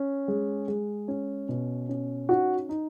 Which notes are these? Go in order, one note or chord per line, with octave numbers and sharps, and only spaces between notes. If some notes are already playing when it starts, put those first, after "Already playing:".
Already playing: C#4
G#3
G#3
C#4
B2
C#4
D#4 F#4 F#5
D#4